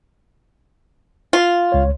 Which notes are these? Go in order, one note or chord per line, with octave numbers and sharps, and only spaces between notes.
F4
C#2 C#5